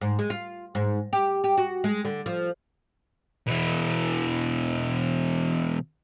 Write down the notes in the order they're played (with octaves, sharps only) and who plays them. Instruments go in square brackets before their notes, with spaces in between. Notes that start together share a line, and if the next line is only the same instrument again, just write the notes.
[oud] G#2
G#3
F4
G#2
G4
G4
F#4
G#3
D3
F3
[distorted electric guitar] B2 E3